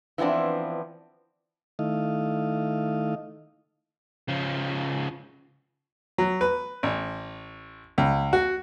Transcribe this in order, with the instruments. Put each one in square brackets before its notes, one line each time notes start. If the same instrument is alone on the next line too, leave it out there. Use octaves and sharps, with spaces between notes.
[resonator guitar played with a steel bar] E3 F3 B3 C4 D4
[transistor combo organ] D#3 A3 E4 D#5 F5
[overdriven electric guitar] C#3 F3
[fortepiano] F#3
B4
A1
C#2
F#4